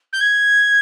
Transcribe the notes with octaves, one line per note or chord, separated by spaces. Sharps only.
G6
G#6